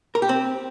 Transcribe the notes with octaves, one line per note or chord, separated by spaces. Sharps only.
A#4
G4
C4